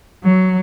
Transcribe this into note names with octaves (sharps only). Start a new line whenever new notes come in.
F#3